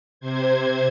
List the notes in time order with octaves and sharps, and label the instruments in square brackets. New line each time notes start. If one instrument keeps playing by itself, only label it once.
[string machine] C3 C5 G#6